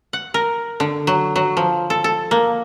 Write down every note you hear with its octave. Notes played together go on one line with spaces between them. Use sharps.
F#5
A#4
D3
F#3
F#3
F3
A4
A4
A#3